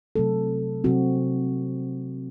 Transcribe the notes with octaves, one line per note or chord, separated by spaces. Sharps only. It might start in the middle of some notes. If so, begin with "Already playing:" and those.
C3 F#3 A3 C4 A4
C3 F#3 C4 F#4